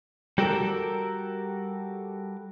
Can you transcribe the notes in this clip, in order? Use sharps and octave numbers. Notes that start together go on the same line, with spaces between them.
G3 F#4 G4 A4 A#4